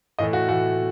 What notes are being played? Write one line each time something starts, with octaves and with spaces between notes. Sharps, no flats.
A2 E3 A3 D#5
F#4
A2 E3 A3 F#4